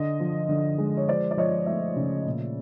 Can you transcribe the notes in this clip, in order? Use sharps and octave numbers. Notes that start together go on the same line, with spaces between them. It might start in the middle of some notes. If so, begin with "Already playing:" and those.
Already playing: D3 D#5
F3
D3
G#3
C#5
F3 C5 D5
D5
F3 C#5 D#5
A3 D5 E5
C#3
A#2